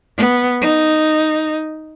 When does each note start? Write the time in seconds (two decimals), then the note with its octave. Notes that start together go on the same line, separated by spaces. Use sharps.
0.17 B3
0.61 D#4